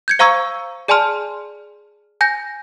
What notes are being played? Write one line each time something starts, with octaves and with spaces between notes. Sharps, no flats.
G6 G#6 C#7
C5 F5 A#5 C#6 E6 G#6
G#4 D5 G#5 A5 C6 F6
G#5 G6 A#6